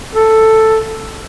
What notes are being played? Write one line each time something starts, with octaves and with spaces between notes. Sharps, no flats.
A4